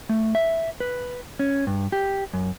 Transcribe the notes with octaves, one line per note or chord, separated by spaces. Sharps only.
A3
E5
B4
C#4
G2
G4
F#2